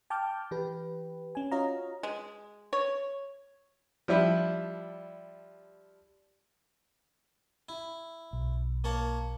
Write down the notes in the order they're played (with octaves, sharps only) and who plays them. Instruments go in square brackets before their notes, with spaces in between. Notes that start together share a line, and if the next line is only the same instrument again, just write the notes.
[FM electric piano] G5 A5 D6 F6 G6
E3 G4 B4
C#4 G#5
F4 F#4 C#5 D#5 F5 A#5
[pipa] G#3
C#5
[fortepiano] F3 G3 D4 E4
[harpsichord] E4
[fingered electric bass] B1
[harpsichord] A#3 C#5 A5